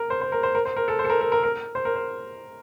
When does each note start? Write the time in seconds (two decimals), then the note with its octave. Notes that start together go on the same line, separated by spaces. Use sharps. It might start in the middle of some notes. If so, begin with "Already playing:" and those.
Already playing: A#4
0.10 C5
0.21 C5
0.32 A#4
0.43 C5
0.55 A#4
0.65 C5
0.76 A#4
0.88 A4
0.99 C5
1.05 A4
1.10 A#4
1.21 A#4
1.32 A#4
1.43 A#4
1.75 C5
1.85 A#4
1.96 C5